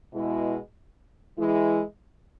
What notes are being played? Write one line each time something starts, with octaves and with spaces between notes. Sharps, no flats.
B2 G#3 E4
E3 G#3 E4